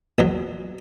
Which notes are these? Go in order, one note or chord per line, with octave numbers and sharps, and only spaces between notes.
A#1 E2 F#3